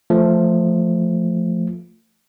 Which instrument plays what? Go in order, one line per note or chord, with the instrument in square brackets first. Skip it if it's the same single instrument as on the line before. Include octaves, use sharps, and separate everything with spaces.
[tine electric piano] F3 A3